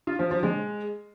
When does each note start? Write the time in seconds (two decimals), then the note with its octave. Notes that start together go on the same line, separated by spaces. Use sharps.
0.07 F4
0.19 F3
0.31 F3
0.43 G#3